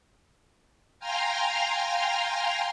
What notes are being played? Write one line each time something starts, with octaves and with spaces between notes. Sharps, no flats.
F5 G5 G#5 A#5 C6 F6